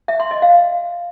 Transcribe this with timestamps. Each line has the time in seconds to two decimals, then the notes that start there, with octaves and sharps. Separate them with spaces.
0.08 E5
0.20 C6
0.31 D#5
0.42 F5